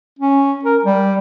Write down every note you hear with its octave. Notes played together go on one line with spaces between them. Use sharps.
C#4
A#4
G3